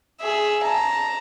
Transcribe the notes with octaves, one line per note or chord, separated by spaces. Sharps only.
G#4 E5
A5 A#5